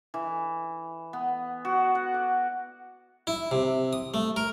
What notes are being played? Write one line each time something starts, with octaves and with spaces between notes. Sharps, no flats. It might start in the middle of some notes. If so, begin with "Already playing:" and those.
E3
B3
F#4
F#5
D5
E4
C3
D#6
A3
A#4